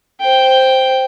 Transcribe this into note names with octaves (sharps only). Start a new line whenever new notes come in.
C5 G5